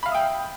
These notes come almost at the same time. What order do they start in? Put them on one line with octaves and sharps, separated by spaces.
B5 F5 E5 D#6 G5